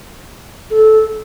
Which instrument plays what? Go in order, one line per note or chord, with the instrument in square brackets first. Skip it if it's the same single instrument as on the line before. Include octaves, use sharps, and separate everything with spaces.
[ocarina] A4